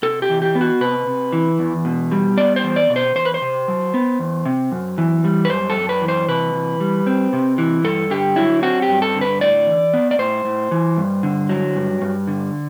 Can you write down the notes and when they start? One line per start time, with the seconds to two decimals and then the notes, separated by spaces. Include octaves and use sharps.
0.03 C3 A4
0.22 G4
0.29 E3
0.42 G4
0.55 B3
0.61 F#4
0.81 C3 B4
1.07 C3
1.33 E3
1.59 E2
1.85 B2
2.12 G3
2.37 B3 D5
2.56 C5
2.63 E2
2.76 D5
2.90 B2
2.96 C5
3.15 E2 C5
3.25 B4
3.34 C5
3.42 C3
3.68 F#3
3.94 B3
4.19 E2
4.46 C3
4.72 F#2
4.98 E3
5.24 G3
5.45 B4
5.50 F#2 C5
5.70 A4
5.76 F#2
5.89 B4
6.02 E3
6.08 C5
6.28 C3 B4
6.54 E3
6.80 G3
7.06 C4
7.33 C3
7.58 E3
7.84 G2 A4
8.10 D3 G4
8.36 F#3 E4
8.63 C4 F#4
8.82 G4
8.89 G2
9.02 A4
9.15 D3
9.21 B4
9.41 A2 D5
9.67 E3
9.93 B3
10.11 D5
10.19 A2 C5
10.45 A2
10.71 E3
10.97 G2
11.23 D3
11.49 F#3
11.76 G2
12.02 G2
12.28 D3